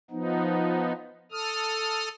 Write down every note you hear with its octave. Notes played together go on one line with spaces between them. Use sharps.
F3 B3 D#4
A4 D#6 F6